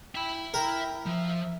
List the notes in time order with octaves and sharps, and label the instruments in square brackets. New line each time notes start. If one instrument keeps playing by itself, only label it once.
[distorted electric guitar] E5 B5 [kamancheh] G5
[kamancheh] E4 G5 [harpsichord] A#4
[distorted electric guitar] F3 [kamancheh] E5